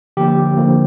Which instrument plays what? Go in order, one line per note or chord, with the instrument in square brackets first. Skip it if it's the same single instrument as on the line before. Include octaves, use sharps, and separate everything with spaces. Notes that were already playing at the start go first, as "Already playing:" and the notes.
[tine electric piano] D3 F3 A#3 G4
D3 F3 A#3